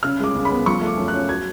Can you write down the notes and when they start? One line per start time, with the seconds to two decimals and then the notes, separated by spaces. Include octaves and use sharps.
0.03 C#3 F6
0.20 G#3 D6
0.35 C#2
0.45 B5
0.51 B3
0.66 F3 C#6
0.81 A3
0.87 D6
0.97 F#2
1.08 F#6
1.14 C#4
1.29 F#3 G#6